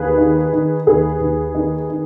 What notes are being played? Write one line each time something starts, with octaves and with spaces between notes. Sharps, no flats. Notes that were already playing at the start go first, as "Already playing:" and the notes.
Already playing: D#2 G#4 B4
D#3
D#3
D#2 G#4 B4
D#2
D#3
D#3